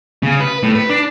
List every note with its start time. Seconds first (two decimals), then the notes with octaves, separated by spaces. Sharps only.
0.23 C#3
0.40 B4
0.63 A2
0.75 B4
0.89 D4